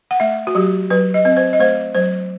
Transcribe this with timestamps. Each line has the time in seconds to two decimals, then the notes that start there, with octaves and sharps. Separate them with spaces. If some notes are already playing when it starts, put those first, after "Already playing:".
0.11 F#5
0.20 A3 E5
0.47 F#4
0.55 F#3 G4
0.90 F#3 B4
1.14 D#5
1.25 C4 D#5
1.37 C5
1.53 D#5
1.60 A3 C5
1.95 F#3 C5